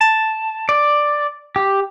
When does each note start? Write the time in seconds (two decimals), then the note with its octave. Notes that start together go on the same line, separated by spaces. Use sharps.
0.01 A5
0.69 D5
1.56 G4